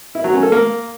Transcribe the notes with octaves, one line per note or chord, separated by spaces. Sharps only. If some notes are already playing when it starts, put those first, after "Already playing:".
E4
F#3
C#4
A4
A#3